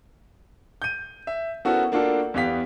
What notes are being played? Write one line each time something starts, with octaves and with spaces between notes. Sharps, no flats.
G6 D#7
E5
B3 C#4 E4 F#4 A4 A#4
A#3 D4 F4 F#4 A4
E2 B3 G4 F5 B6